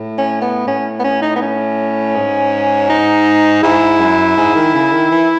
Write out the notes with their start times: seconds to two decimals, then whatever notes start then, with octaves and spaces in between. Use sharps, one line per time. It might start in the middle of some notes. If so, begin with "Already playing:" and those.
Already playing: A2
0.18 C#4
0.41 B3
0.66 A2 C#4
0.99 B3
1.04 C#4
1.22 D#4
1.36 B3
1.41 C#4
2.15 G#2
2.90 D#4
3.63 G#2 E4
3.99 F#2
4.37 G#2
4.55 D#3
4.74 C#3
4.92 D#3
5.11 E3